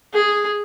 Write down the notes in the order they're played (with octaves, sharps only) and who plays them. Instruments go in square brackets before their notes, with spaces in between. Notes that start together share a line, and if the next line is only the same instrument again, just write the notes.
[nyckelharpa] G#4